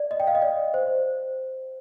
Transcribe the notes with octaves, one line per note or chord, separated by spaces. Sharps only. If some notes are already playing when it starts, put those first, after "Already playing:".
Already playing: D5
D#5
G5
F5
D#5
D5
C5